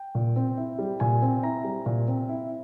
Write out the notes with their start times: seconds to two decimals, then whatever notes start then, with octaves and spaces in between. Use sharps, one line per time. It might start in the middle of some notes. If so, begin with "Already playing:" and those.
Already playing: G5
0.15 A#2
0.36 C4
0.58 E4
0.79 G3
1.00 A#2 G#5
1.22 C4
1.43 E4 A#5
1.64 G3
1.86 A#2
2.08 C4
2.29 E4